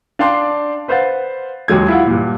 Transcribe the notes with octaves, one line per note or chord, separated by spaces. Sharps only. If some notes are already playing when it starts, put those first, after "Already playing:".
D4 D5 F5 G5 A5 C6
B4 C5 F5 F#5 A6
D#2 F#3 G#3 G#6
E4 F4 F#5
G2 A#2